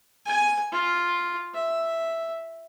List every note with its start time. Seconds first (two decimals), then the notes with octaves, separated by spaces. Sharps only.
0.26 G#5
0.72 F4
1.54 E5